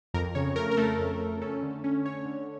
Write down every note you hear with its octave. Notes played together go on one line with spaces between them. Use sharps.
F2 A#4
C#3 C#5
A3 A#4
A#4
A3 A4
F2
A3
C#4 A4
D3
C#4
C#4 C#5
D3